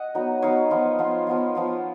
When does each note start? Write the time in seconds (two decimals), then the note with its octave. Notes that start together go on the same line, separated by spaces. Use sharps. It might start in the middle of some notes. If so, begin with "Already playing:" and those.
Already playing: D#5 F#5
0.15 F#3 B3 D#4
0.42 F#3 B3 D#4 C#5 F5
0.71 F3 B3 F4
0.99 F3 B3 F4
1.27 F3 B3 F4
1.55 F3 B3 F4